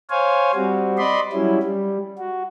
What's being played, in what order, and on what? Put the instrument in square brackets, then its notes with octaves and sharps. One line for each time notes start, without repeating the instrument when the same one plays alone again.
[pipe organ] C5 C#5 F5 G#5
G3 C4 F#4
D5 D#5 B5 C6
F#3 G3 C#4 E4
G3
F#4